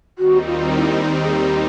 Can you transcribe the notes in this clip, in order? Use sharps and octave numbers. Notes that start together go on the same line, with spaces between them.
D#2 D#3 G3 C4 D#4 F#4
F4
E4
G#4
G4